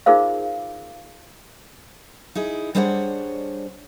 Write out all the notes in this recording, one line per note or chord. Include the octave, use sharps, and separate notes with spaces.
D#4 F4 G#4 A#4 C5 F5
D#4 E4 G#4
G3 D4 G#4 C5 C#5 F#5